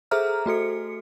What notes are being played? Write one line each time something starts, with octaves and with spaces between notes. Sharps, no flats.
G#4 A4 C5 E5 A#5 F6
A3 F#4 A4 C#7